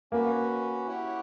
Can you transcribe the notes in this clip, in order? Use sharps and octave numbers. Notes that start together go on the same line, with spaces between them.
A#3 C#4 F#4 B4
E4 G4 C#5 F#5